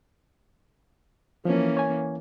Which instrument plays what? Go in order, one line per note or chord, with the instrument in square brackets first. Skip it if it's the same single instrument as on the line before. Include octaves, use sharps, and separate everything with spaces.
[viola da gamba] E3 A#3 C#4 [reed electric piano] F3
[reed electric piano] C#5 G#5